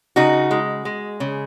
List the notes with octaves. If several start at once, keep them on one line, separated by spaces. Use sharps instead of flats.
C#3 D#4 F#4
G#3
G#3
C#3